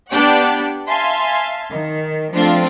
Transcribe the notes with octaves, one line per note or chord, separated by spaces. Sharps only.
B3 D4 G4 D5 F#5 G5
E5 F5 G#5 A5 C6
D#3
F3 A3 C4 D4 F4